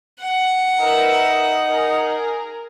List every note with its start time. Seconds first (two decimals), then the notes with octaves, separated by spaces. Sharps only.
0.21 F#5
0.80 D#4 A#4 B4 E5
1.68 G#4 A#4